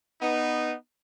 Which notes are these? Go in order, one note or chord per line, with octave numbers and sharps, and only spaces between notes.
B3 D#4